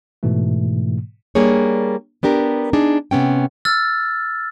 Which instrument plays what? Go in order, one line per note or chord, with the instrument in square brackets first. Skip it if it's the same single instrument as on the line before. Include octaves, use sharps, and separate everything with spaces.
[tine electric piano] G#2 B2 E3 A3
[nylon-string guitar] G3 A#3 D4 G#4 C#5
B3 D4 G4 A#4
D4 D#4 G#4
C3 B3 C#4 G5
[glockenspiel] E6 F6 A6